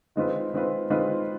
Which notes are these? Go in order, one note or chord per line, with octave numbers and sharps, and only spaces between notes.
D#3 G#3 C4 F4 B4
D#3 G#3 C4 F4 B4
D#3 G#3 C4 F4 B4